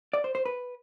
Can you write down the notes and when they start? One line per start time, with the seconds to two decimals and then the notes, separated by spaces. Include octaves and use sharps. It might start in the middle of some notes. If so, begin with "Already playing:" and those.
0.13 D5
0.24 C5
0.35 C5
0.46 B4